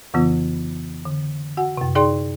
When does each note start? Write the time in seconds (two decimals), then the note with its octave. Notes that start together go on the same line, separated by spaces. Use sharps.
0.14 F2 C#3 E3 B3 F4
1.05 D3
1.57 F#4 F#5 G#5
1.77 F#2 C3
1.95 D#4 G#4 D5 G5 C6